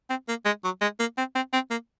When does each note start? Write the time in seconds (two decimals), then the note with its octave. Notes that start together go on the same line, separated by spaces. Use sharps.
0.10 C4
0.28 A#3
0.45 G#3
0.64 F#3
0.81 G#3
1.00 A#3
1.18 C4
1.35 C4
1.53 C4
1.71 A#3